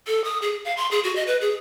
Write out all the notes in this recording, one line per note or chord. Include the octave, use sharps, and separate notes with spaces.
A4
D#6
G#4
F5
C6
G#4
F#4
D#5
B4
G#4